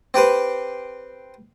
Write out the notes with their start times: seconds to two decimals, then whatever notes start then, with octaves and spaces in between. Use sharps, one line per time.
0.14 C4 G4 B4 C5